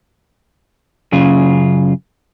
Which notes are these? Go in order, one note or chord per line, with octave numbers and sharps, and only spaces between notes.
F#2 C#3 F4